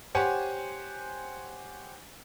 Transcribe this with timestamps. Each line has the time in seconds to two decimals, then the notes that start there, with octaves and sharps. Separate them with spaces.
0.15 G4 C5 C#5 F#5 G#5